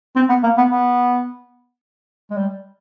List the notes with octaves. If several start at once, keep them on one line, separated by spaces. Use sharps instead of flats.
C4
B3
A#3
B3
B3
G#3
G3